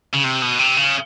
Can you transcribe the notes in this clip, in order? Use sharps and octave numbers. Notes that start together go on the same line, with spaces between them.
C#3
C3
B2
C3
C#3